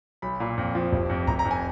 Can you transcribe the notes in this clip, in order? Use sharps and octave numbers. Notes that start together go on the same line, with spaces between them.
B1 B5
A#2
F2
F3
F1
F2
F1 A#5
A#5
F2
G#5